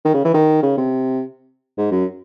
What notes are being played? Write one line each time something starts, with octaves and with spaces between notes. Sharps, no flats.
D#3
C#3
E3
D#3
C#3
C3
G#2
F#2